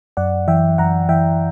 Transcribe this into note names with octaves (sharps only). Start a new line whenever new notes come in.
F#2 D5 F#5
E3 E5 G5
F#2 F#5 A#5
E3 E5 G5